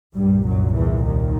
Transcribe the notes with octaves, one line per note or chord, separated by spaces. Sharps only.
C2 G2 A#2 G3
F#2 F#3
E2 E3
D#2 D#3